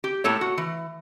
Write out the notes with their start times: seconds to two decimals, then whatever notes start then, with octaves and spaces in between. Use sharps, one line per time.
0.04 G4
0.24 A2 A#3 A4 C#5
0.41 F#4
0.58 E3